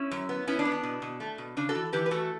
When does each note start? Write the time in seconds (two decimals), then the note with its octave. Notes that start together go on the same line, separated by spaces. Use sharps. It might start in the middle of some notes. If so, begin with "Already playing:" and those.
Already playing: C#4 E4
0.11 F#2
0.29 B3
0.47 B3 C#4 E4
0.59 D4
0.65 B3
0.72 D4
0.83 B2
1.02 B2
1.20 A3
1.38 B2
1.57 C#3 D4
1.69 F#4 A4
1.75 E3
1.93 E3 G4 B4
2.06 B4
2.11 A3 F#4 A4